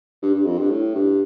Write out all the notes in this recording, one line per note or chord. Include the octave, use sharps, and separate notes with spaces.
G2
G2
F2
G2
A2
G2